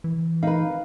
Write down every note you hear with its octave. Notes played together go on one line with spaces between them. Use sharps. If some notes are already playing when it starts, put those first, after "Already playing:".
E3
D#4 B4 F5